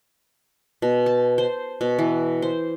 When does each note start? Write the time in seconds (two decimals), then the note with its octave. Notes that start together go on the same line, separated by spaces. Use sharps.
0.82 B2
1.06 A5
1.38 C5
1.81 B2
1.99 E3
2.42 C5